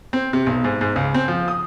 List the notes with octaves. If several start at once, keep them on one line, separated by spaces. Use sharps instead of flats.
C4
C3
B1
G#2
G#2
C#2
C4
F3
D#6